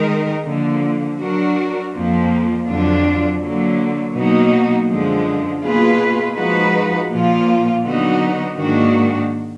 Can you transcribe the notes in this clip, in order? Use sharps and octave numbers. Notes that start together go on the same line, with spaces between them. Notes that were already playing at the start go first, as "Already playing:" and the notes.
Already playing: D#3 G#3 D#4 A#4
D3 F3 A#3
F#3 D4 F#4 A#4
F2 F3 A#3
F2 D3 F#3 D4 F4
D3 F#3 A#3
B2 F#3 A#3 D#4 F#4
F#2 D3 F3 G#3
B2 A#3 F4 G#4 B4
F3 G#3 D#4 F#4 B4
A#2 F3 A#3 F4
D3 F#3 B3 D#4 F#4
G#2 D#3 A#3 D4 F#4